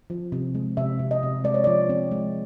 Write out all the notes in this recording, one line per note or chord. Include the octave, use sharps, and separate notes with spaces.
F3
C3
G#3
C3 E5
C3
D#5
C3
G#3 D5
C#5
F3 D5
C4
G#3